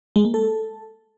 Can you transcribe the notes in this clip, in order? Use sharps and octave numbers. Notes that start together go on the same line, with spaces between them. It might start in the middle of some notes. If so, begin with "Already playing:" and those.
G#3
A#3
A4